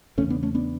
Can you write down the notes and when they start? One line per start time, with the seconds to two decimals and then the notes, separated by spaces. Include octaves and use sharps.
0.18 E2 C#3 A3 C#4
0.30 B3 D4
0.43 A3 C#4
0.55 B3 D4